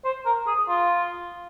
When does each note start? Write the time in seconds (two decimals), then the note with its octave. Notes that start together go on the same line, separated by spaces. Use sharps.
0.05 C5
0.26 A#4
0.47 G#4
0.68 F4